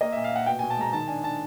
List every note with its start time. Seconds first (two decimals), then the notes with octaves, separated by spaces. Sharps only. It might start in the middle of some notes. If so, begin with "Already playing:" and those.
0.01 A#3 D#5
0.12 A#2 E5
0.24 F5
0.31 A#2 F#5
0.46 B2 G5
0.59 B2 G#5
0.70 A5
0.77 G#3 A#5
0.93 D#3 A5
1.08 D4 G#5
1.23 D4 A5